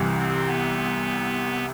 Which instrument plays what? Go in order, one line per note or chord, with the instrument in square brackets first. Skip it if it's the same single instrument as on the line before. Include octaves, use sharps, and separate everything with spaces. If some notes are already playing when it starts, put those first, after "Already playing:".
Already playing: [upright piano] C2 C3 E3
[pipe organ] C4
B3